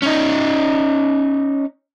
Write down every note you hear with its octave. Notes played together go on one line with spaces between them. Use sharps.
C#4 D#4